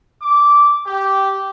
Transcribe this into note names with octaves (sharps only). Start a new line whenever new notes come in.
D6
G4